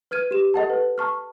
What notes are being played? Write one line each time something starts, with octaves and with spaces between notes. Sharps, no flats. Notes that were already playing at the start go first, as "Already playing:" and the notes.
B4 F6 G#6 D#7
G4 E7
A4 D#5 F#5 A5
B4
A5 C#6 F6